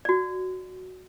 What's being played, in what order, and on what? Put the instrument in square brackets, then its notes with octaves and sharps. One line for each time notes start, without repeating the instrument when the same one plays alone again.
[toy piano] F#4 D5